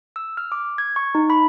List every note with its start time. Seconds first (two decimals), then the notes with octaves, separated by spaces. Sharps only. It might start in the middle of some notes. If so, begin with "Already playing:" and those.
0.16 E6
0.37 F6
0.52 D6
0.78 G#6
0.96 C#6
1.15 D#4
1.30 B5